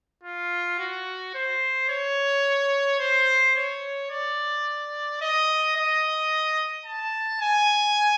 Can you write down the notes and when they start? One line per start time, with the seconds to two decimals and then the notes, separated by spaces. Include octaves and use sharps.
0.24 F4
0.79 F#4
1.34 C5
1.89 C#5
2.99 C5
3.56 C#5
4.10 D5
5.21 D#5
5.76 D#5
6.86 A5
7.41 G#5